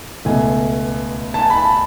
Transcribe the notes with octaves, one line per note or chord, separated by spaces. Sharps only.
C#2 B2 A3 G#5
A5
G#5
B5
A5